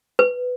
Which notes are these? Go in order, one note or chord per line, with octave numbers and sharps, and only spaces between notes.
B4